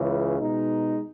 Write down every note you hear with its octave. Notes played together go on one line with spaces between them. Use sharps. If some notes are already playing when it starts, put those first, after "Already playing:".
Already playing: C#2 C#3 E3
B2 G#3 D#4